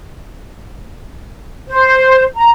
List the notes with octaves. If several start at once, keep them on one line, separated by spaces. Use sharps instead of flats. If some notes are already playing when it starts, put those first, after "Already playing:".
C5
A#5